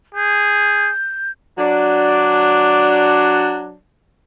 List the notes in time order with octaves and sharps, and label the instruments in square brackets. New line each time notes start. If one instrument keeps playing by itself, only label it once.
[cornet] G#4 [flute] G6
[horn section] F#3 D4